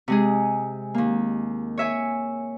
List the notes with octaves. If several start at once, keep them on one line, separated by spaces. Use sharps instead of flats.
C3 G#3 G#4
D#2 A#3
C#5 E5 G#5